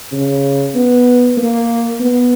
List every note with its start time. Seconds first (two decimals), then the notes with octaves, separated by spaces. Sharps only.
0.12 C#3
0.75 B3
1.37 A#3
2.00 B3